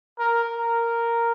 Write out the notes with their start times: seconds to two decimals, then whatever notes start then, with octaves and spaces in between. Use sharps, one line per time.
0.19 A#4
0.54 A#4